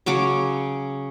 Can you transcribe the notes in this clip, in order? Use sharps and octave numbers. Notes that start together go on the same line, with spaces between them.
C#3 F#3 C#5 D6